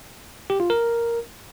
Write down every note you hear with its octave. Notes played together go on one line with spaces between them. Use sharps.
G4
F4
A#4